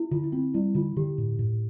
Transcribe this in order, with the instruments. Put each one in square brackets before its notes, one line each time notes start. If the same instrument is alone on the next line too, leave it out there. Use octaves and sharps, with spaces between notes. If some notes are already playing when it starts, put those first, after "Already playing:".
Already playing: [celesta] E4
[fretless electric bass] D3 [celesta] F4
[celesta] E4
[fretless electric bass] C4 [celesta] F4
[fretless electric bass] G3 [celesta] E4
[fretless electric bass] D3 [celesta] F4
[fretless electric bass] D3 [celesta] G4
[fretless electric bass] A2
A2